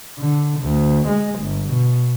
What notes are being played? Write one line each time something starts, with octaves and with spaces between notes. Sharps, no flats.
D3
D2
G#3
G1
B2